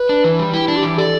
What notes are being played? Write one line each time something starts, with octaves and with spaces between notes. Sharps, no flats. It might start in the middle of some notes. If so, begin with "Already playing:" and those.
Already playing: B4
D4
E3
G3
E4 G4
D4
G4
E3
A4 D5